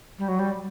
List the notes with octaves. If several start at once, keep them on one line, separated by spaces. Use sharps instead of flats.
G3
F#3
G3